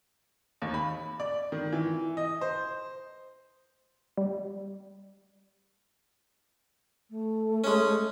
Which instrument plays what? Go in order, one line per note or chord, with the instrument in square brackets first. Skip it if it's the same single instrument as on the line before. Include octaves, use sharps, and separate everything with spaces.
[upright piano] D#2
B5
D5
D#3
E3
D#5
C5
[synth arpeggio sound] G3
[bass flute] A3
[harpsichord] G#3 C#4